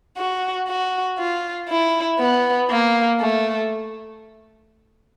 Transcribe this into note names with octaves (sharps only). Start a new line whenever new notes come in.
F#4
F#4
F4
E4
B3
A#3
A3